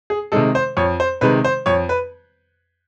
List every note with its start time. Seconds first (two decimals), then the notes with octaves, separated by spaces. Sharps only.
0.10 G#4
0.32 C3 D#3 G#3 A4
0.55 C5
0.77 F2 C#5
1.00 C5
1.21 C3 D#3 G#3 B4
1.45 C5
1.66 F2 C#5
1.89 B4